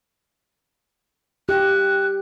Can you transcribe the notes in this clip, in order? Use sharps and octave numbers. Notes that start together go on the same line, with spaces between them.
G4 F#6